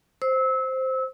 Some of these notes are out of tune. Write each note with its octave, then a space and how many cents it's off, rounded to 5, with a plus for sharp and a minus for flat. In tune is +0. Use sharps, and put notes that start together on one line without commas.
C5 +0 E6 -25